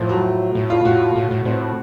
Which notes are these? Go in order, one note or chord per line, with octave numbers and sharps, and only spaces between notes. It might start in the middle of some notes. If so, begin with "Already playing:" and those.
Already playing: A2 F3
F#3
A2
F4
A2 F#4
A2
A2
A2 C4